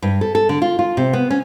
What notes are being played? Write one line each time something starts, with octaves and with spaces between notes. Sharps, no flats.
G2
A4
A4
D3
F4
F4
C3
B3
C#4